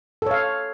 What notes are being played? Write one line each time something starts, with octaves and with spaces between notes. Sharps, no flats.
A4 C#5 F5